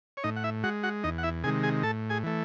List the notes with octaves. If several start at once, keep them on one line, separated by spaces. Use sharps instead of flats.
C#5
A2 D#4 D#5
F#5
E4 E5
G#3 F#4 F#5
F#4 F#5
E2 D#4 D#5
F#5
E4 E5
C3 D#3 G#3 G#4 G#5
G#4 G#5
A2 A4 A5
G#4 G#5
E3 A3